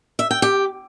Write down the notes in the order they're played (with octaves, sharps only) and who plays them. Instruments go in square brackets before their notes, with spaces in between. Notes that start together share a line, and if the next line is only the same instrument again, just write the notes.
[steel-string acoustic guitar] E5
G5
G4